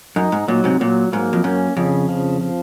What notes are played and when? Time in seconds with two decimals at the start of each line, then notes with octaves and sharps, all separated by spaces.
0.16 F#2 D#4
0.32 G#2
0.48 A#2 F#3
0.64 G#2 C3
0.80 A#2 F#3
1.12 G#2 A#3
1.33 F2
1.44 F#2 C#4
1.77 F2 C#3
2.09 F3
2.41 F3